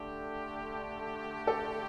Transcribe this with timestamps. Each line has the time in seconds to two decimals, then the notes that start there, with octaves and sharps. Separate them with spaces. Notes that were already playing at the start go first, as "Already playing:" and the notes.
Already playing: D3 A3 D4 G4
1.47 A4